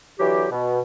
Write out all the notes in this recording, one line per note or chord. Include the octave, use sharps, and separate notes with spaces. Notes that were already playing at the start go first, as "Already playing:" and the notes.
D3 E3 F#3 G4
B2